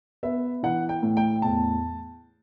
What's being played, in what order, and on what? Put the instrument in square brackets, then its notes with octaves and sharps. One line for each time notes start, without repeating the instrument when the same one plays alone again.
[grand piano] B3 E5
E3 F#5
G5
A2
G5
E2 A5